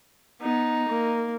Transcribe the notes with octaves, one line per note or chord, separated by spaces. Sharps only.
B3 D#4
A#3